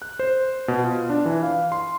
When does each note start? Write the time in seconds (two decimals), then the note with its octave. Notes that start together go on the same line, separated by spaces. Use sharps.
0.02 F#6
0.19 C5
0.68 B2
0.84 F4
1.10 D4
1.26 E3
1.43 F5
1.72 C6